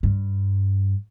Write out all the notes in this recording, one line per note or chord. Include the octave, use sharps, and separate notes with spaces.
G2